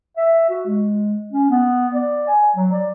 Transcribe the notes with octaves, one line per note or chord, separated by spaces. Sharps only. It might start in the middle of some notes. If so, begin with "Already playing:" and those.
E5
F#4
G#3
C#4
B3
D5
G#5
F#3
D5